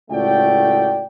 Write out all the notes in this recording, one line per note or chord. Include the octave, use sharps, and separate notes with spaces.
C#2 A2 A3 F#4 D5 G5